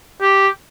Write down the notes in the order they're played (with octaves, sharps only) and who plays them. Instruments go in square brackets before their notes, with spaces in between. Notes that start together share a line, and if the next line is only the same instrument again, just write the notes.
[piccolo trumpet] G4